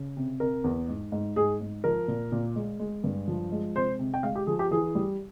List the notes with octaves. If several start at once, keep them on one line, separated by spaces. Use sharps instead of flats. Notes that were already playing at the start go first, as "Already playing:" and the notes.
Already playing: C#3
C3
C3 A#4
E2
G#2
G#2
G#2 G#4
G#2
F3 A#4
A#2
A#2
G#3
G#3
G2
F3
G#3
C3 C5
C3
G5
G#3 F5
G4
F3 G#4
G4
E3 G#4
G3